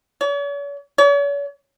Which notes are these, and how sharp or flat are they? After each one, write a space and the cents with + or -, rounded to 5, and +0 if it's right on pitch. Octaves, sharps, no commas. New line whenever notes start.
C#5 +45
C#5 +45